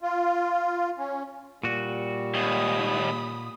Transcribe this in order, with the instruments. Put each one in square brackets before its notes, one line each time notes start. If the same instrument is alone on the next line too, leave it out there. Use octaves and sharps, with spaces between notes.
[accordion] F4
C#4
[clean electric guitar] A#2 F#4 [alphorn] G3
[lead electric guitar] D#2 G#2 [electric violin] B5 D#6